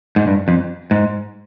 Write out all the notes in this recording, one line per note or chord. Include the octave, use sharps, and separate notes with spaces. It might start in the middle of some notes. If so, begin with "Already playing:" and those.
G#2
G2
F2
G#2